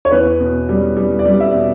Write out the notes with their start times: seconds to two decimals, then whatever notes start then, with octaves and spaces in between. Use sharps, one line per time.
0.05 C#5
0.11 E2 B4
0.40 B2
0.69 G3
0.97 G3
1.19 D5
1.26 G3
1.40 E5
1.54 B2